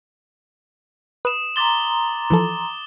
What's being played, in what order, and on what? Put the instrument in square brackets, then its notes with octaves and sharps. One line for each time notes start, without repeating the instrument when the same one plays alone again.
[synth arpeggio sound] B4 [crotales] D#6 E7
[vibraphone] A#5 C6 [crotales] D6 A6 G7
[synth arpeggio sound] E3 F3 A4